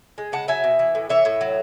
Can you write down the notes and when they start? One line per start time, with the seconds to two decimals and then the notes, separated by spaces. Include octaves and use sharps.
0.18 G#3
0.32 C#3 F#5 A5
0.48 F#3 E5 G#5
0.64 B2
0.79 E3
0.95 A2
1.09 E3 C#5 E5
1.25 A2
1.41 F#3